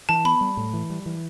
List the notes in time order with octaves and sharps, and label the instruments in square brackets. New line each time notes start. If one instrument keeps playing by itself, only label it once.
[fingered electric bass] E3 [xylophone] A5
[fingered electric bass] B3 [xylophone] B5
[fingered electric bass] G3
A2
E3
G3
E3